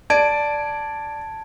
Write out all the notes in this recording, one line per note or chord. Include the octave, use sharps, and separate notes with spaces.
D5 A5 G#6 D7